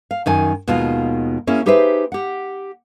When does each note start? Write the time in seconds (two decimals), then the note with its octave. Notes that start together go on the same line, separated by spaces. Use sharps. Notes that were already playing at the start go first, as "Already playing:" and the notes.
0.11 F5
0.26 F#2 D#3 G#5
0.68 D#2 B2 D#3 G#3 F4
1.47 A#3 C#4 E4 G#4
1.66 D#4 G4 G#4 B4 C5 E5
2.12 G4 F#5